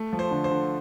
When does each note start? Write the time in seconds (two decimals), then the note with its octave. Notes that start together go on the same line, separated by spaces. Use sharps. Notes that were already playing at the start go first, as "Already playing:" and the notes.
Already playing: A3
0.13 F3
0.19 C5
0.31 D3
0.44 C5
0.51 D3